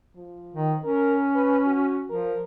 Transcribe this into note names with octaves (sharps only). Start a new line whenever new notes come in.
F3
D#3
C#4 A#4
B4
F#4
F3 A#4